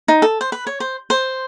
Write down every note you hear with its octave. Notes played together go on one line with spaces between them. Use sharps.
D#4
A4
C5
B4
C#5
C5
C5